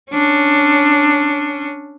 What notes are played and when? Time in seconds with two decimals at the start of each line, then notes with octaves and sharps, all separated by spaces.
0.11 C#4 D4